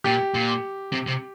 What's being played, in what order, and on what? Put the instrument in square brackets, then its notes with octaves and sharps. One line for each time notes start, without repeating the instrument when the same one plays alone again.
[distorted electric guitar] A#2 [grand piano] G4
[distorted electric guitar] A#2
C3
C3